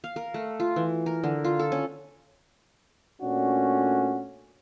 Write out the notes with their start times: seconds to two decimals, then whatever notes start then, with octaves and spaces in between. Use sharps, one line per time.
0.04 F5
0.16 A#4
0.34 A3
0.60 F4
0.76 E3
1.06 A#4
1.24 D3
1.44 F4
1.59 A4
1.72 C#4
3.22 A#2 A3 C#4 D4 F#4